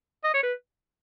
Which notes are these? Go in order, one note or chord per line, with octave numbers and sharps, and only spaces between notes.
D#5
C#5
B4